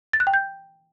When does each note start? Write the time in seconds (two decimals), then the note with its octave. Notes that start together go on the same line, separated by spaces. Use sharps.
0.13 A6
0.20 F#6
0.27 G5
0.34 G6